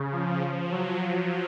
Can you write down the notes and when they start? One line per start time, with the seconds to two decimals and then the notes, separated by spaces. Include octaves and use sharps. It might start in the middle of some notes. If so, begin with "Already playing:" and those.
Already playing: C#3
0.12 F3
0.71 F#3